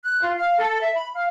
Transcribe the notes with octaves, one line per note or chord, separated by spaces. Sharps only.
F#6
F4
F5
A4
E5
B5
F5